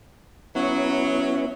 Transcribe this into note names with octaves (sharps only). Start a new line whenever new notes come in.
F#3 B3 C#4 E4